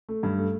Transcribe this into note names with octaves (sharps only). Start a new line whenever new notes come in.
A3
G2
A3